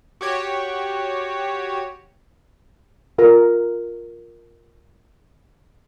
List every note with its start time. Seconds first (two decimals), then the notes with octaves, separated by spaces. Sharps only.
0.21 F#4 G4 C#5
3.18 F4 A#4 A#5